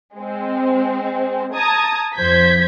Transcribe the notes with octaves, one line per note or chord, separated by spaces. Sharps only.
G#3 C4
A5 A#5 D#6 G#6
F2 F3 C5 G6 G#6 B6